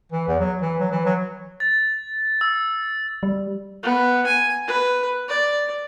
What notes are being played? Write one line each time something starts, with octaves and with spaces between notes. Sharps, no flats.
E3
E2
F#3
E3
F#3
E3
F#3
A6
E6
G3
B3
G#5
B4
D5